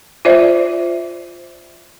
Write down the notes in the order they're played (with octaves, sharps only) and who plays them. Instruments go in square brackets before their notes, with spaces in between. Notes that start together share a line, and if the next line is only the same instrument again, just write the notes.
[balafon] F4 C5 D5 E5